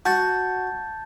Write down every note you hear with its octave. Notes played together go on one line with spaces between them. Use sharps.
F#4 A5 G6 A6